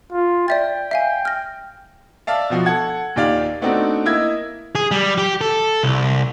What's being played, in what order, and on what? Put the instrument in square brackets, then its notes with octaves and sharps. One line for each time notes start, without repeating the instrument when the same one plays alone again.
[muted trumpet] F4
[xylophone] D5 E5 A6 [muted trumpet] G5
[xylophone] E5 F5 G#5
F6 A#6
[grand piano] D5 E5 F5 A5
B2 F3 F#4
A4 F#5 G#6
D#2 A#2 G4 D5 F5
A3 B3 C4 D4 D#4 F#4
A#3 E4 D#5 E5 G#6
[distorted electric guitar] G#4
G3
G4
A4
C2